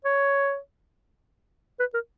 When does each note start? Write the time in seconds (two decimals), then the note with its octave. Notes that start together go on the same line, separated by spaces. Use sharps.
0.05 C#5
1.80 B4
1.94 A#4